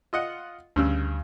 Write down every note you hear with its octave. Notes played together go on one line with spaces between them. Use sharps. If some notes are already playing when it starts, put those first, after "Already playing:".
F4 D#5 F#5
D2 G2 C#3 E6